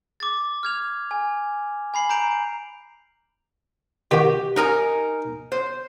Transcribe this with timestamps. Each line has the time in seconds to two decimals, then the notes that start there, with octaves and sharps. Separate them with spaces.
0.20 D6 A6
0.63 F6 G#6 F7
1.11 G#5
1.94 G#5 B5 C7 F#7
2.09 A#5 G6 D7 F7
4.11 D#3 F#4 G4
4.56 D#4 A#4 G#5
5.52 C5